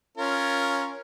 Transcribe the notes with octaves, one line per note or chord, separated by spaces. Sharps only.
C#4 F4 A#4